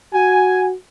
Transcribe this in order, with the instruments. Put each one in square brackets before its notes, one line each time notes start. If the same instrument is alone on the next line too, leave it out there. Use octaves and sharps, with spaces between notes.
[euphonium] F#4 [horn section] G#5